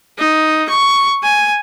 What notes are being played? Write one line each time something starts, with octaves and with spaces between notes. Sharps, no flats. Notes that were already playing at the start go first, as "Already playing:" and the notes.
D#4
C#6
G#5